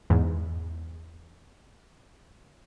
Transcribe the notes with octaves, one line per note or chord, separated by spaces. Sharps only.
E2 G#2